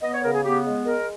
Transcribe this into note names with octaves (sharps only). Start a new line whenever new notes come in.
B3 D#5
C#5
C#3 A#4
G#4
B3 G4
G#3
G#3 A#4